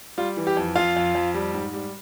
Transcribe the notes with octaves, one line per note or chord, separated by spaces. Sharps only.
G3 F4
E3
G4
F2
F2 F4 F5
F2
F2
G3
G#2
G3